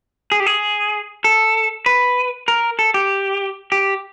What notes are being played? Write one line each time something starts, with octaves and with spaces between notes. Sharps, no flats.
G#4
G4
G#4
A4
B4
A#4
A4
G4
G4